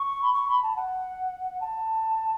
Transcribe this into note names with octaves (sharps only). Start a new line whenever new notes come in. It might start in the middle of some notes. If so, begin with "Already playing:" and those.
Already playing: C#6
B5
C#6
B5
A5
F#5
A5